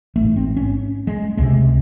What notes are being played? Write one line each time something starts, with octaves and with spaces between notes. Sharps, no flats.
A1 G#2 A3
C4
C#4
G#3
C#2 C3 G#3